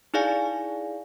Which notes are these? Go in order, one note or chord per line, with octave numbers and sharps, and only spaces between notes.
D#4 E4 G#4 D5 F5 G#5